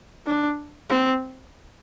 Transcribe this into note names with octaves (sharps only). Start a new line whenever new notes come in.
D4
C4